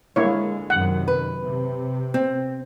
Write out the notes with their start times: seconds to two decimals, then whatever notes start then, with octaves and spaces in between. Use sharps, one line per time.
0.16 D3 G#3 A#3 E4 C#5
0.70 F#2 C3 D#3 F#5
1.08 B4
1.42 C3
2.14 C4